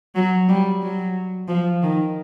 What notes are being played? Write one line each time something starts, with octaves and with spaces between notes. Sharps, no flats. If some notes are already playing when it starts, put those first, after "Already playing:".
F#3
G3
F#3
F3
D#3